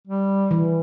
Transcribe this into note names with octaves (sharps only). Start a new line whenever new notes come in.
G3
E3